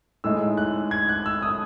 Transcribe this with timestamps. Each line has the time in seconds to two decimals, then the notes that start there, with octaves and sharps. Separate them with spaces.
0.24 A2 G#3 D#4 E6
0.57 F#6
0.91 G#6
1.09 F#6
1.26 E6
1.42 D#6